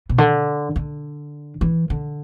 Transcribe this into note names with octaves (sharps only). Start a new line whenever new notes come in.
B2
D3
D3
E3
D3